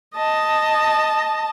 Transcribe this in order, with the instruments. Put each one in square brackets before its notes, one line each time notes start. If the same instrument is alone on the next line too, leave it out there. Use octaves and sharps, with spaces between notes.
[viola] D#5 A5